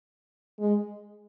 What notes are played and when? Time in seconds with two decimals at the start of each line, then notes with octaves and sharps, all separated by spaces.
0.59 G#3